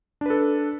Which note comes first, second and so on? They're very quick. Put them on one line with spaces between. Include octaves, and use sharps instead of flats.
D4 B4 A4